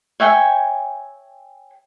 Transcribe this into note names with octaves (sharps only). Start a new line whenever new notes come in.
C#5 E5 G5 G#5